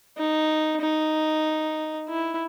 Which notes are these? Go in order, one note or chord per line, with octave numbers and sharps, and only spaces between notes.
D#4
D#4
E4